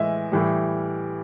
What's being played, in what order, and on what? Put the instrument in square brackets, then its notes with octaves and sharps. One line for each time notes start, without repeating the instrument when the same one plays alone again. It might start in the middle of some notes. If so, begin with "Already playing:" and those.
Already playing: [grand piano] A2 E3 G#3 D#5 E5
A2 E3 G3